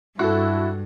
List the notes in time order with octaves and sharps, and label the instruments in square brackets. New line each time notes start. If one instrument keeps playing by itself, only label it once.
[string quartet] G2 [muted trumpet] E4 [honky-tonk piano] F#4 A4